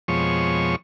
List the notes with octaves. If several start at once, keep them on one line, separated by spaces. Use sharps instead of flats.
F2 B2 F3 G#3 C#5 C#6